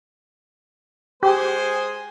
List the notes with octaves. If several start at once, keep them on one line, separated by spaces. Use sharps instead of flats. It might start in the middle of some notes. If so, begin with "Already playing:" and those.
G#3 G4 G#4 C5